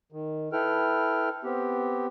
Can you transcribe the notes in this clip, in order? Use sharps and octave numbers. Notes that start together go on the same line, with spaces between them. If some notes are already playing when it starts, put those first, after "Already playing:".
D#3
E4 A4 B4 G5 F6
B3 C4 G4